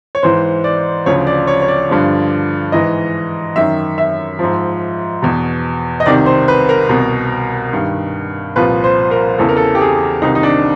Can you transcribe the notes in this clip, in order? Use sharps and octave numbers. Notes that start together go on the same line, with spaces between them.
C#5
G#2 E3 C5
D5
D2 C#3 F3 C#5
D5
C#5
C#5
D5
G2 D3 F3
G#2 E3 D#5
F#2 D#3 E5
E5
G#2 F3
E2 B2
D#5
C2 C3 D#3 D5
C5
B4
A#4
C2 B2
G2 D#3
C2 A#2 F3 B4
C5
A#4
E2 C#3 E3 A4
A#4
A4
G4
G#4
C2 C3 D#3 D#4
D#4
D4